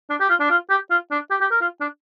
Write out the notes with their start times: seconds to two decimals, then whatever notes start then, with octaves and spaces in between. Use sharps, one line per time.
0.10 D4
0.20 G4
0.30 F4
0.40 D4
0.50 F4
0.70 G4
0.90 F4
1.11 D4
1.31 G4
1.41 G4
1.51 A#4
1.61 F4
1.81 D4